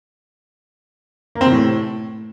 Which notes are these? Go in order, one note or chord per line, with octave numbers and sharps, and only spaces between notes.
A#3
C4
C3
A2